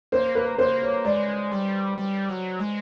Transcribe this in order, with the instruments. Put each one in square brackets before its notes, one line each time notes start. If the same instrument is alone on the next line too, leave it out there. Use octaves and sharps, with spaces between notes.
[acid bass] A#3 [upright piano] C5
[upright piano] B4
[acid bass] A#3 [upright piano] C5
[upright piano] C#5
[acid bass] G#3 [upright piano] D5
[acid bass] G3
G3
F#3
G#3